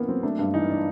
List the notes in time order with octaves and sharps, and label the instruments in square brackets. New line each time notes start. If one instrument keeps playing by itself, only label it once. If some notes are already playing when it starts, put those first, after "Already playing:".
Already playing: [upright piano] E3 A#3 C#4 [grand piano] B3
[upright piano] F#3 [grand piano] C4
[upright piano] A3 [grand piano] D4
[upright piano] G2
[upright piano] E3 [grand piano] D#4
[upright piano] D4